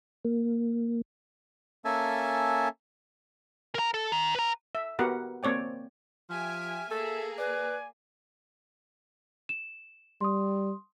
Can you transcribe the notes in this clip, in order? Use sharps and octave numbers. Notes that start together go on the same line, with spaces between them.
A#3
A#3 C#4 A4 E5 G#5 A5
A#4 A#5
A4
D#3
B4 A#5
E5
B3 F#4 G4 A#4 B4 F#5
A#3 C4 C#5 D5 G5
F3 G4 E5 G#5 F6
A#3 G#4 A4 E5
B4 D5 G#5
E7
G3 C6 D#6